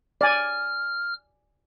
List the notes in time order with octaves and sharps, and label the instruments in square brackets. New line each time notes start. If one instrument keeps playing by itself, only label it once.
[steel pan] D5 G#5 [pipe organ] F6